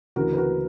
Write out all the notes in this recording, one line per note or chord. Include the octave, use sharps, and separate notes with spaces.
D2 C#3 E3 F#4 A#4
B4
F#4 A#4